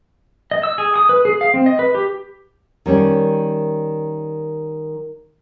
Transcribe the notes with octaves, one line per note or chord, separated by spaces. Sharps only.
D#5
E6
G#4
D#6
B4
G#4
F5
C4
D#5
B4
G4
D#3 G3 C#4